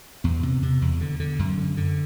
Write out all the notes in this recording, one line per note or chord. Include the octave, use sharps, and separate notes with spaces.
E2 B3
C3
C3
E2
D3
D3
F#2
D3
D3